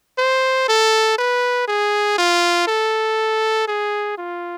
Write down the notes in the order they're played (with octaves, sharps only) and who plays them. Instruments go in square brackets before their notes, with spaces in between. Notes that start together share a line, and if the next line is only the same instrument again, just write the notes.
[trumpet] C5
A4
B4
G#4
F4
A4
G#4
F4